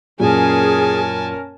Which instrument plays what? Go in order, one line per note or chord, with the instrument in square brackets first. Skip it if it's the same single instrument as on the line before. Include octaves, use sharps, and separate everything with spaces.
[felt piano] F#2 A#2 F#3 [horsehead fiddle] C#4 A#4 [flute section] G#4 [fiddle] G#5 A5